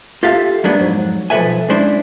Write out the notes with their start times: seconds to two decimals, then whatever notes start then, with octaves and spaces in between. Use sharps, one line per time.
0.23 F4 G4 A4 E5 F5
0.64 F#3 G#3 A#3 B3 D4
0.79 F2 G#2 F#3
1.30 B1 F3 A4 B4 E5 G#5
1.69 G#3 C#4 D4 E4 C5